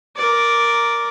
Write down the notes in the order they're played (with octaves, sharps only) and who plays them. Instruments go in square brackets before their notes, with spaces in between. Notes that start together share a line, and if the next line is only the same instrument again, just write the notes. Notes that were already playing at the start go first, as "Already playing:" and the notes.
[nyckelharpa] A#4 D5